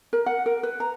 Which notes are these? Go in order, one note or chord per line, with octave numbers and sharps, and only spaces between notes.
A#4
F#5
A#4
B4
A#5